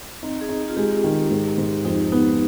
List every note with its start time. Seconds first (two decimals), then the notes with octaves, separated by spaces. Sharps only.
0.22 C4 D#4
0.41 G#4
0.49 D#4
0.59 G#4
0.68 F4
0.76 G#3 G4
1.04 D#3
1.31 G#2
1.58 G#2
1.85 F2 D#4
2.12 B3 D#4